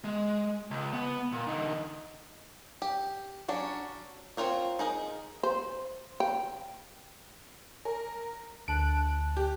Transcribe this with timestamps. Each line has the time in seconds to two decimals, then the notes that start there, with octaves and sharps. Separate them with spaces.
0.04 G#3
0.71 C#2
0.93 B3
1.32 A#2
1.47 D3 D#4
2.82 G4
3.48 F#3 C#4 D4
4.37 C4 C#4 F4 A#4 C#5
4.79 D#4 G#4 A#4 D#5
5.43 C5
6.20 G5
7.85 A#4
8.68 D2 A5 F#6 D7
9.37 G4